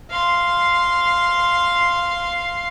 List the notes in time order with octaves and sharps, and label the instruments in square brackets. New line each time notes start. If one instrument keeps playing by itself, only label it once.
[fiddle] F5 C6